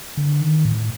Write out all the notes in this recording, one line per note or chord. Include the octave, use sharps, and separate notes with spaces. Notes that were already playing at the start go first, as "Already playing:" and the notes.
D3
D#3
A2